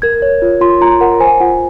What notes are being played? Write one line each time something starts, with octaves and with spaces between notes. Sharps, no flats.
A#4 G#6
C#5
F4
F4 C6
F4 A#5
A#4 F#5
C5 G#5
F4 F#5